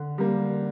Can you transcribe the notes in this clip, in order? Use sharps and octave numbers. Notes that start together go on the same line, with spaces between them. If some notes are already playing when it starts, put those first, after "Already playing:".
Already playing: D3
G3 A#3